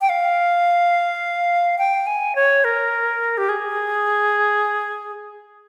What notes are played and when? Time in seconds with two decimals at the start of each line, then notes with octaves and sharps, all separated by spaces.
0.01 G5
0.09 F5
1.78 G5
2.07 G#5
2.35 C#5
2.64 A#4
3.38 G4
3.49 G#4